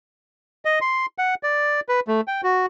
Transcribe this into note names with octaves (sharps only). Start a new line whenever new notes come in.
D#5
C6
F#5
D5
B4
A3
G5
F#4